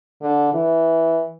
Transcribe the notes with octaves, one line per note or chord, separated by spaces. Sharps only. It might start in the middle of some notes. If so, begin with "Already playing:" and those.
D3
E3